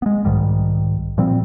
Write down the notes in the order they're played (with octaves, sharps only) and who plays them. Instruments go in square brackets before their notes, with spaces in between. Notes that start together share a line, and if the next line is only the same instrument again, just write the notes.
[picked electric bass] G#3 B3
B1 G#2 D#3 G3
A#2 F3 G3 C4